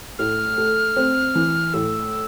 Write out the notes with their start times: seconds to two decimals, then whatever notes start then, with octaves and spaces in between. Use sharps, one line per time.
0.19 A2 F6
0.58 A3
0.97 C4
1.35 E3
1.74 A2 E6